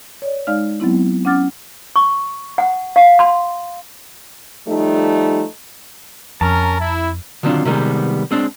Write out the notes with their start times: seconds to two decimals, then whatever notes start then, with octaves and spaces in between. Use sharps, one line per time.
0.22 C#5 D5
0.47 G#3 D#4 D5 F5 F6
0.80 F#3 B3 C4 E4
1.25 C#4 F#5 D6 F6 A6
1.96 C#6
2.58 F#5
2.96 F5
3.19 C6
4.67 F3 G3 A3 D#4
6.41 F2 C#4 A#4 A5 A#5
6.80 E4
7.43 D3 D#3 F#3 C4 D4 F4
7.65 C3 D#3 G3 G#3 B3
8.31 G#3 C4 D4